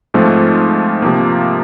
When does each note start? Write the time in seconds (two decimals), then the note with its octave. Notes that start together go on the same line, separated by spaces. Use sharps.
0.14 G#2 F3 A3 C4
1.02 C3 F3 A#3